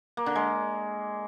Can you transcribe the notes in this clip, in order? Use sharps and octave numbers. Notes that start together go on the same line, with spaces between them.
A#3
D3
G#3